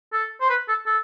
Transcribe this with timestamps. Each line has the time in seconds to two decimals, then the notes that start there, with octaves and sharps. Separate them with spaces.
0.13 A4
0.41 C5
0.50 B4
0.68 A4
0.86 A4